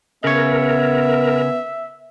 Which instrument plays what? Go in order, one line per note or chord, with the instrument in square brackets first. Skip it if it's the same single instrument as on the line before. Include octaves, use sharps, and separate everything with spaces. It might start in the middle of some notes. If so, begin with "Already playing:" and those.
[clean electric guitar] C#3 C#5 [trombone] B3 [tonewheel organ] A#4 [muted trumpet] E5